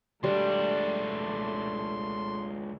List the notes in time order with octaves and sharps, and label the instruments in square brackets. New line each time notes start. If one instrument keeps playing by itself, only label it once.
[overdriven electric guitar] C#2 D4 [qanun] G3 [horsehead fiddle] A3 [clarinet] C6